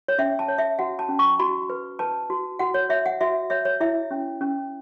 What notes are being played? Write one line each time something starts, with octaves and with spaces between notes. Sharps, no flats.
C#5
C#4 E5
A5
C#5
E5
F#4 F#5
A5
C#4
C#6
F#4 B5
B4
B4 A5
F#4
F#4 F#5
C#5
C#5 E5
F#5
F#4 E5
C#5 E5
C#5
E4 E5
C#4
C#4